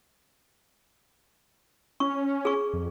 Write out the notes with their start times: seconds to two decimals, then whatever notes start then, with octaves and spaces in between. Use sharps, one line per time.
2.00 C#4 C#6
2.45 G#4 C#6
2.73 F2